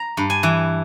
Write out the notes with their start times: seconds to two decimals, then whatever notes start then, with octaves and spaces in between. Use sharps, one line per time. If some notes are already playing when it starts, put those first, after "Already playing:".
Already playing: A#5
0.17 G2
0.30 G#5
0.43 E3